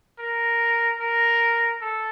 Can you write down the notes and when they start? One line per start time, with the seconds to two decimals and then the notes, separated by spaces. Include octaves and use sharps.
0.19 A#4
1.00 A#4
1.81 A4